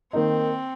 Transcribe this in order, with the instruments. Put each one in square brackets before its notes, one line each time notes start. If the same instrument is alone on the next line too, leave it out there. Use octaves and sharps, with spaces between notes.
[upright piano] D#3 A#3 D#4 [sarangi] C4